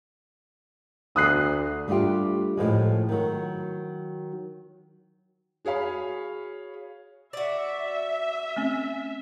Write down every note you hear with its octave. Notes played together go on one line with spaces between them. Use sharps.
D2 D#6 F#6 C7
G3 A3 D4 F4 G4
A2 F3 G#3
D#3 F#3
F#4 G#4 C#5 F5 B5
F#4 D5 E5
A3 C4 C#4